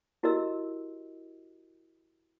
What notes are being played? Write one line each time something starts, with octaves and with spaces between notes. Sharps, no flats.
E4 F#4 G4 A#4 D#5 E6